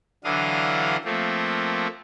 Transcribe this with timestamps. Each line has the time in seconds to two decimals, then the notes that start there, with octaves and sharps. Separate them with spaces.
0.24 D3 E3 F#3 D4 F5 D#6
1.05 F3 A3 A#3 C4